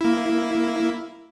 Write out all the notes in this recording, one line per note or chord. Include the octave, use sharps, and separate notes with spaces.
A#3 E4